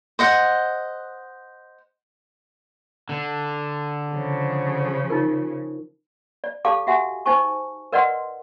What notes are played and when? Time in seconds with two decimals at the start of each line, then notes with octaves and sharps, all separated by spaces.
0.19 C5 D#5 F#5
3.09 D3
4.12 C#3 F3
5.10 D#4 F4 A#4
6.44 D5
6.65 G4 A4 D5 F5 A5 D6
6.87 F#4 G4 E5 F#5 G#5
7.26 D#4 C5 G#5 A5 C#6
7.92 A#4 B4 D5 D#5 F#5 C6